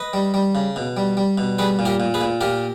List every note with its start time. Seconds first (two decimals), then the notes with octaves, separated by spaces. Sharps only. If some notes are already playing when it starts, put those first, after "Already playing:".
Already playing: B4 D#5
0.13 G3
0.34 G3
0.55 C#3
0.76 B2
0.97 G3
1.17 G3
1.38 B2
1.58 G3 G#4 B4
1.79 A#2
1.85 G4 A#4
2.00 A#2
2.14 G#4 B4
2.21 A#2
2.41 A#2 G4 A#4